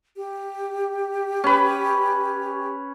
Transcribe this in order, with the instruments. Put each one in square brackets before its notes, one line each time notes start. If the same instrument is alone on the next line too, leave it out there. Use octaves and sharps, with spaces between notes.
[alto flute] G4
[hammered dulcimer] C#4 B4